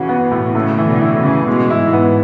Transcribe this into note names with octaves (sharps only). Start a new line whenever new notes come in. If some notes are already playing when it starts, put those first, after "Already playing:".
Already playing: C#3 E3 F#4
B3
B2
A2
C#3 A3
E3
B2 D3
E4
C#3
E3
B2 G#3
E4
G#2
B3